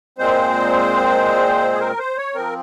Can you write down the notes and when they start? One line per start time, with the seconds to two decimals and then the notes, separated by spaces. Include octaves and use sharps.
0.18 A#2 G#3 C4 C5
1.73 G#4
1.80 A#4
1.99 C5
2.17 C#5
2.34 F3 C4 A#4